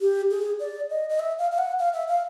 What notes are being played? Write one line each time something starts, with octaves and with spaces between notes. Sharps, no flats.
G4
G#4
D5
D#5
D#5
E5
F5
F5
F#5
F5
E5
F5